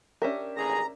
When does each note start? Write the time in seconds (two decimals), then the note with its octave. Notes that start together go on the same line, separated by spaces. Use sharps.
0.22 C#4 D4 G4 A#4 E5
0.57 A1 D#2 G#4 A#5